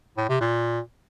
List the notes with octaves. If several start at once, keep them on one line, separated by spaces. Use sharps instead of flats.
A2
C3
A#2